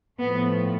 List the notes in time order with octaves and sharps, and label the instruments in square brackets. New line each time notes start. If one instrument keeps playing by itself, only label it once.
[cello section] A2 F3 A3 B3